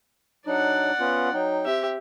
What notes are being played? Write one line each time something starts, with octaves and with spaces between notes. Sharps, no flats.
F#3 D4 D#4 D5 F#5
B3 C#4 F4
F#3 D#4 G5
C4 G4 E5